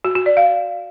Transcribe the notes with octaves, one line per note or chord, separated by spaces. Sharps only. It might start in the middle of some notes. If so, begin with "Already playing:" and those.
F#4
F#4
D5
F5